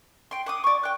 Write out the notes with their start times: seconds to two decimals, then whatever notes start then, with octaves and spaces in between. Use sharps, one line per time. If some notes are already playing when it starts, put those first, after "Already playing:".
0.31 G5 C6
0.46 F#5 D6 D#6
0.64 D5 C#6
0.83 G5 F#6